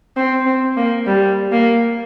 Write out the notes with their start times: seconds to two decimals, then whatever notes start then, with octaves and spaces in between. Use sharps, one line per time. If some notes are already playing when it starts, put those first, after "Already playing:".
0.16 C4
0.46 C4
0.77 A#3
1.06 G3
1.52 A#3